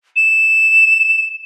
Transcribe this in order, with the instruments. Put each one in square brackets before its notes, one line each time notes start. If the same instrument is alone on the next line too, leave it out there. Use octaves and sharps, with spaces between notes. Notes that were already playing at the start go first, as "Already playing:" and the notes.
[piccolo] E7